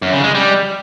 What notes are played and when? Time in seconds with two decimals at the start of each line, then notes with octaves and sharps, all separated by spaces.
0.02 F#2
0.13 C#3
0.24 G#3
0.34 G3